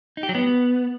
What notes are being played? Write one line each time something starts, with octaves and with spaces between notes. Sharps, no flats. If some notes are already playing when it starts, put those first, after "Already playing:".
D#4
G4
F#3
B3